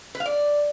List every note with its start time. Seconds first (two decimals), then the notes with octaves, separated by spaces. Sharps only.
0.15 B4
0.20 F5
0.26 D5